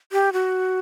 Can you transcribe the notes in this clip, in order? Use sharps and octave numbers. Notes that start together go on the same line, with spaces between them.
G4
F#4